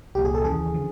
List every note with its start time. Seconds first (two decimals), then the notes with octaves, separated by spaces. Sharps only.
0.15 C2 A#2 F3 G4
0.25 G#4
0.35 A4
0.44 D#2 C#3 E3 G#4
0.74 D3 F3